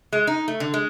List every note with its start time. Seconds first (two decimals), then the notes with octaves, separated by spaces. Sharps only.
0.13 G#3
0.27 D#4
0.48 A3
0.60 D3
0.74 G#3